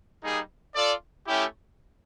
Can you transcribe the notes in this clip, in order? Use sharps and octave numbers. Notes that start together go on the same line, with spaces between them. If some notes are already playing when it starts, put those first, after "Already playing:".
G3 A#3 D#4 G#4
F4 A4 D5
A3 C#4 E4 G4